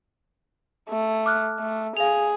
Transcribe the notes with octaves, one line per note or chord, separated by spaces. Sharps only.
A3
D6 F6 F#6
A3
G#4 F5 F7